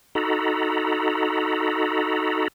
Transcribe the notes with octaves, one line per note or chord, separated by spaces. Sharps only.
D#4 F#4 A4 A#5 B5